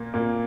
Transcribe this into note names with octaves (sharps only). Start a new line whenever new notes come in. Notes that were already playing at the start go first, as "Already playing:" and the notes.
Already playing: A#2 A#3
A#2 A#3